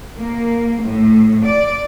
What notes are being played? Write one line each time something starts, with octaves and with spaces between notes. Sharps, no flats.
A#3
A2
D5